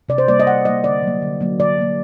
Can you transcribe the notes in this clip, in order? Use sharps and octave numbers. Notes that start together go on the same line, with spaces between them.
C3 D5
C5
G3 A#3 D5
D#5
C3 F#5
G3 A#3 D#5
D3 D5
F#3 A#3
D3
F#3 A#3
D3 D5
F#3 A#3